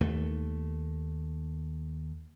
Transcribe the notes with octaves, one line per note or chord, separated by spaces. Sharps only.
D#2 A3